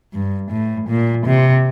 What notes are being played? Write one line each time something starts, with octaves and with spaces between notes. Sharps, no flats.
G2
A2
A#2
C3